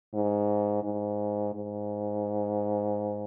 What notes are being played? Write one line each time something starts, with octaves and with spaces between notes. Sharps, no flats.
G#2
G#2
G#2